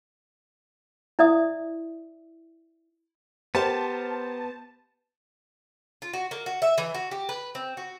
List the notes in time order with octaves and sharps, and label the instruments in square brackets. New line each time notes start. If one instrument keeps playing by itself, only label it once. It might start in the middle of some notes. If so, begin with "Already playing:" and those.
[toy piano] E4 D5 E5 D#6
[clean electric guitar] B3 [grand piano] G4 A#4 C5 [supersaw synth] A5
[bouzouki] F4
F#4
A#3
F#4
E5
E3
F#4
G4
B4
C4
F#4